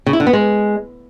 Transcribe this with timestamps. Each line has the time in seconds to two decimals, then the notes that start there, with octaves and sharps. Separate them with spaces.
0.07 C#3
0.13 E4
0.20 D3
0.27 B3
0.33 G#3